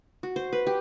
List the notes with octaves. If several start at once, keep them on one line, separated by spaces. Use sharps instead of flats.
F#4
C5
B4
G4